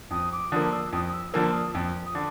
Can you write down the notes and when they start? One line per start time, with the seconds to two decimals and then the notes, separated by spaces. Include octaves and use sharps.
0.11 F2 D#6
0.32 D6
0.51 D3 F3 A#3 D#6
0.73 E6
0.93 F2 D#6
1.09 D#6
1.14 E6
1.33 D3 F3 A#3 E6
1.54 D#6
1.75 F2
2.05 D#6
2.15 D3 D6